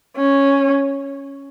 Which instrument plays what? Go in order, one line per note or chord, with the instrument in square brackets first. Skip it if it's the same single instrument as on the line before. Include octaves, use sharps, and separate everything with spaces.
[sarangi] C#4